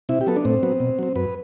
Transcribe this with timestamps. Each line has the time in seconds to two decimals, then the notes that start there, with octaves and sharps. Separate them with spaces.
0.09 C3 E4
0.21 G4
0.27 F#3 B3 A4
0.36 D4
0.45 A2 C4
0.63 F#3 B3
0.80 B2
0.99 F#3 C4
1.16 F#2 B4